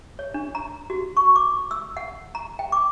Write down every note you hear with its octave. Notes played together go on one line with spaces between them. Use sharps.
C#5
D4
A#5
F#4
C#6
D6
E6
F#5
A#5
G5
D6